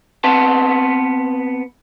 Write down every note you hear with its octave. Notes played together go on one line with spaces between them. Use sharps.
B3 C4 B4 A5